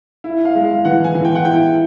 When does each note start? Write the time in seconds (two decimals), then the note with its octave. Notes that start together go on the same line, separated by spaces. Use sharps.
0.24 E4
0.45 F5
0.55 G#3
0.64 F5
0.85 E3 F#5
1.04 G#5
1.15 E3
1.25 G5
1.35 F#5
1.45 E4 G5